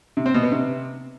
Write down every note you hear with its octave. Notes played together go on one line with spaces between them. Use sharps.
C3
C4
B2
B3
C3